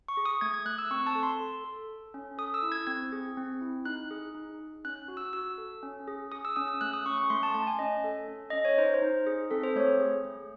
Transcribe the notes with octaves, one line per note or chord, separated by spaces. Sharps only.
C#6
G#4
D#6
A3 G#6
G#6
A3 F#6
E6
C4 C#6
A5
A4
C6
A4
A4
A4
C#4
A4 D#6
E6
E4
G#6
C4 G#6
G#4
C4
E4
D#4 F#6
G#4
D#4
D#4
C#4 F#6
F#4
E6
F#4 E6
A4
C#4
G#4
G#4 D#6
E6
C#4 D#6
E6
A3 F#6
D#6
C#4 C#6
C#6
A3 C6
A5
A3 A5
G#5
C#4 D#5
A4
C#4
C#4 D#5
C#5
D#4 C5
C5
D#4
G#4
C4 A4
C5
A3 C#5
G#4
A3